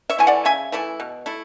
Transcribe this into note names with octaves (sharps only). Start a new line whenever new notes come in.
C#5 E5
E3 A3 E4 G#5
D5 F#5
C#3 E5 G#5
E3 A3 E4
B2
A3 E4